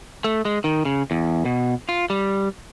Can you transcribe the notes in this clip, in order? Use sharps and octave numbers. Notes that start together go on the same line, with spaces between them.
A3
G#3
D#3
C#3
E2
B2
F4
G3